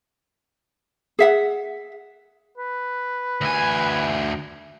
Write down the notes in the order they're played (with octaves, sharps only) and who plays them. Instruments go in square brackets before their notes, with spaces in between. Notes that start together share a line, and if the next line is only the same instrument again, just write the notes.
[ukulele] G#4 E5 F#5
[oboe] B4
[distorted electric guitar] D2 G#5